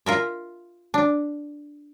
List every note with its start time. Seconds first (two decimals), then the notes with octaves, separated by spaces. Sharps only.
0.06 F4 A#4 E5
0.94 D4